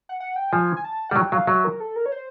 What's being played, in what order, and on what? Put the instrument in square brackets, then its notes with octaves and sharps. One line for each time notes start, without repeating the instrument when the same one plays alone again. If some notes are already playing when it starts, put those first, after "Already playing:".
[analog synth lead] F#5
F#5
G5
[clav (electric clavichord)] F3 [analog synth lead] G#5
[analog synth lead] G#5
A5
[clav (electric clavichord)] G3 [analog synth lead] F#5
[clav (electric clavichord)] F#3 [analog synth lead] G5
[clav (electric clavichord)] F#3 [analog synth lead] F5
[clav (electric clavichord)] F#3 [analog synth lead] E5
[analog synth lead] A#4
A4
A#4
C#5
C5